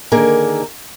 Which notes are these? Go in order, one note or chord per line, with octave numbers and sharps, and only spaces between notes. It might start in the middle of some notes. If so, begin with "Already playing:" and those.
D3 D#3 A#3 G#4 A#4